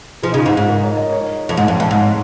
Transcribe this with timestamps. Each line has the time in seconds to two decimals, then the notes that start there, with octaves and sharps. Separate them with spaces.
0.23 F3 G#4
0.32 C#3 D#4
0.38 F4
0.46 G#2
0.53 D#4
0.57 G#2
0.68 A#4
0.83 C#5
0.97 D#5
1.12 C#5
1.49 F2
1.57 G#2
1.68 F2
1.80 F2
1.91 G#2
2.02 C#5